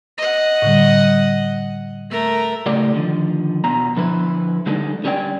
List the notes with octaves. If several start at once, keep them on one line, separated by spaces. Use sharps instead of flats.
D#5 F#5
A2 D3 G3
A3 A#4
A2 C#3 A3 G4 A4 D5
D3 D#3 F3
E2 B2 A#5
D3 F3 E4 B4
D3 G3 G#3 D#4 A4
D3 G3 C#4 D5 G5